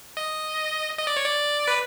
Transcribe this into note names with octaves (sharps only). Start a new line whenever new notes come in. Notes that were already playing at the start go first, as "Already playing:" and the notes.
D#5
D#5
D5
C#5
D5
B4